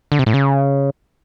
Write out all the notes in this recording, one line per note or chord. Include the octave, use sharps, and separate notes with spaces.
D3
C3
A2
C#3